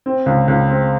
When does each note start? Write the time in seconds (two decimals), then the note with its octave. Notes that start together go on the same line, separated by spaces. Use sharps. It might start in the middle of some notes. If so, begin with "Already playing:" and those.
0.06 C4
0.26 C#2
0.48 C#2
0.69 C4